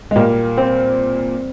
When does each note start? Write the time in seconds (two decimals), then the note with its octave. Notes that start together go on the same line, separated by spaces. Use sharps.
0.11 G#3
0.16 A#2 G3 A#3
0.57 C4